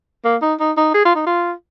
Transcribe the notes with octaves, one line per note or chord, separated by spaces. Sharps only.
A#3
D#4
D#4
D#4
G#4
F4
D#4
F4